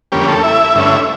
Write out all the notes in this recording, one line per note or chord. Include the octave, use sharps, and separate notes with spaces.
F2 D3 G3 A#3 C#4 G4
A3 A4
E4 E5
G2 D3 A3 C#4